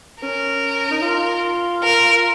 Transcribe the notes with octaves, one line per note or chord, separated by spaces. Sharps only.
C#4 A#4
D#4
F4
A#4